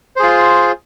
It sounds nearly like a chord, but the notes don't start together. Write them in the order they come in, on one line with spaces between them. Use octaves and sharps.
C5 G#4 F4